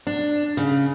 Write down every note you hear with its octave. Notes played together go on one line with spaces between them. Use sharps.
D4
C#3